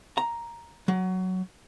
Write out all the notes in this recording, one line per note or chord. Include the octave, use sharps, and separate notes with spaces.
A#5
F#3